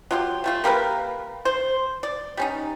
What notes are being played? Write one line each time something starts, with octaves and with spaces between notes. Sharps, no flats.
F#3 F4 G4
G3 A3 F4
A#3 G4 A#4 B4
C5
D5
G3 C#4 D#4